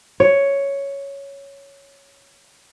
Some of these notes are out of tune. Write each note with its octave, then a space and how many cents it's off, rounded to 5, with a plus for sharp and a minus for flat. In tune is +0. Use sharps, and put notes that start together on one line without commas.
C#5 +5